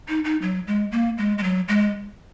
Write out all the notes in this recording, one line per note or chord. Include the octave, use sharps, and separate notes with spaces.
D#4
D#4
F#3
G#3
A#3
G#3
G#3
F#3
G#3